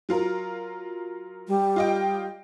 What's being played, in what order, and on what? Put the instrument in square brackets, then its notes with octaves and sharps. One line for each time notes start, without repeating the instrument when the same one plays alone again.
[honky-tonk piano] F#3 F4 A#4
[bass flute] G3
[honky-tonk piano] F4 D#5 G5